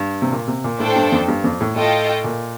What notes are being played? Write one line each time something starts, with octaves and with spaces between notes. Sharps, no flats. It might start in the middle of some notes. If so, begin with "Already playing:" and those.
Already playing: G2
C3
A#2
C3
A#2
A2 D4 A4 C5 G5
G2
F2
G2
F2
A2
A2 F4 A4 D#5 G5
A#2